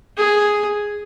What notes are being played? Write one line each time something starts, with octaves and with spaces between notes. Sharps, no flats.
G#4